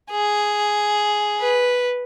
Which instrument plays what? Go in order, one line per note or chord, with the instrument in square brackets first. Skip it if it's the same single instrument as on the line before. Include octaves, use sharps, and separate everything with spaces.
[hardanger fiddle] G#4
B4